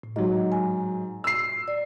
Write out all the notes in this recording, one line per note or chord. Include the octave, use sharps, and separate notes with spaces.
A2
G#2 F#3 D#5
G#5
E6 C7
D5